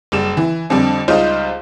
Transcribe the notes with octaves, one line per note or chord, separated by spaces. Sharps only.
F#1 G3 E7
E3
F2 D3 G3
C#2 G3 D#4 F4 C5